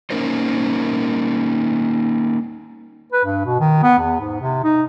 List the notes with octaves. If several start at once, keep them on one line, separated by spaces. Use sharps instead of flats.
A#3 C#4 D#4 A#4 C5
B4
G2
B2
D#3
B3
E2
G#2
C3
D#4